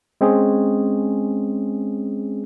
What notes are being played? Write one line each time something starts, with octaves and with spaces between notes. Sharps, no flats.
G#3 C4 C#4 G#4